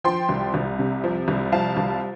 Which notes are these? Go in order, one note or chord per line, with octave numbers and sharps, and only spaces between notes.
F3 G5 C6
C2
C2
C3
F3
C2
F3 F5 A5
C2